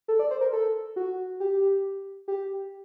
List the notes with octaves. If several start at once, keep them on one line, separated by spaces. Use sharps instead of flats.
A4
D5
C5
A#4
A4
F#4
G4
G4